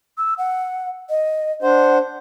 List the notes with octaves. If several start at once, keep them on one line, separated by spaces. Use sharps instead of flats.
E6
F#5
D#5
D4 C5 F#5